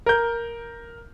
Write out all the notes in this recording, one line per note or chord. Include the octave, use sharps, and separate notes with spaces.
A#4 G6